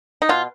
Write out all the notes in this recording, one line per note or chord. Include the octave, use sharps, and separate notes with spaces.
D#4
B2 F4